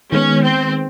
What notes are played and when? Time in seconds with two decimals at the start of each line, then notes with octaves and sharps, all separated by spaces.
0.12 D#3 G#3 B3 C#4
0.43 C4